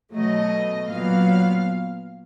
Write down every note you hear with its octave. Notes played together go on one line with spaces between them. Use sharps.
B2 F#3 A3 D#5
A#2 F#3 B3 F5